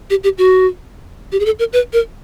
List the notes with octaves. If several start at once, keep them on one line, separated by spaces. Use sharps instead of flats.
G4
G4
F#4
G4
G#4
A4
A#4
B4
A#4